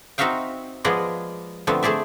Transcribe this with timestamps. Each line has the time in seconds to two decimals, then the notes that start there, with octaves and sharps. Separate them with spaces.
0.18 C4 D#4 F#4 E5 F5 G5
0.85 F3 G#3 B3 G#4 D5 D#5
1.67 D3 F3 A3 B3 C4
1.83 A3 G#4 C5 D5 E5